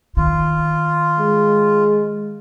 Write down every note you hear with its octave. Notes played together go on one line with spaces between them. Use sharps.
D#3 F4
G#3